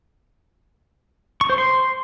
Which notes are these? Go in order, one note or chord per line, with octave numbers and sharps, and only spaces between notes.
C#6
C5
C6